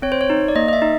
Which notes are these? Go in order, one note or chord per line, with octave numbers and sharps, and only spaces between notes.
C4 C#5
C5
C#5
D#4
D5
A#3 D#5
D#5
E5
D#4